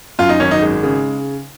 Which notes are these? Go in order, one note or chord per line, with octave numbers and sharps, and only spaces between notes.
F#2 F4
D#4
G#1 C#4
D#4
G#3
C#3